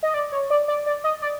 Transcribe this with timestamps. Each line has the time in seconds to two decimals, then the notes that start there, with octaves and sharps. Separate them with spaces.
0.03 D#5
0.14 D5
0.32 C#5
0.50 D5
0.68 D5
0.86 D5
1.04 D#5
1.22 D5